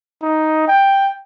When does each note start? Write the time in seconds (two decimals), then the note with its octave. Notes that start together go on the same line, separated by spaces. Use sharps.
0.22 D#4
0.68 G5